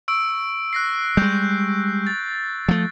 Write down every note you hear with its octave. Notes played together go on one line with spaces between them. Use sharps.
C#6 E6 D7
F#6 A#6 C7
G3 G#3 G6
A6
F3 A3